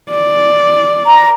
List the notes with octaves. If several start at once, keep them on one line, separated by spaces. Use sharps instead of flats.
D5
A#5